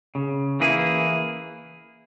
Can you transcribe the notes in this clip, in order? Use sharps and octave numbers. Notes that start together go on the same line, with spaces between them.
C#3
E3 A#3 E4 G#4